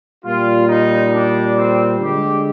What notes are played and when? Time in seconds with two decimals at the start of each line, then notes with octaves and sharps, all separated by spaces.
0.25 A#2 G3 F4
0.68 D#4
1.13 D4
1.56 C4
2.00 D3 G#3 G4